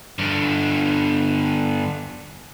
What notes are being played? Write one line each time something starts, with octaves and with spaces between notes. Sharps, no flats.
G2 D3